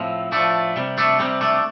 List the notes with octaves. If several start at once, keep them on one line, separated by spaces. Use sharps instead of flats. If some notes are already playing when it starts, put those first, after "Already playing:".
Already playing: A2 F3 C4
A2 F3 A3 D4
C3 G3
A3 D4
C3 G3 C4
A3 D4